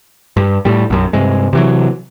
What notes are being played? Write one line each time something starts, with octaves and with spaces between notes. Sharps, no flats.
G2
A2 G3
B1 F#2
G2 C3 G#3
C3 E3 F#3